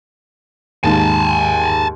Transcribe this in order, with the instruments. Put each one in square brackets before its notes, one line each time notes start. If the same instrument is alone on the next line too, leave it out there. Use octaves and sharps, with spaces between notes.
[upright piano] D#2 G#2 [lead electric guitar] G#5 A5